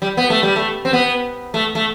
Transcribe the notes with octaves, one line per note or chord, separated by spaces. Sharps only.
G3
B3
A3
G3
A3
C4
B3
A3
A3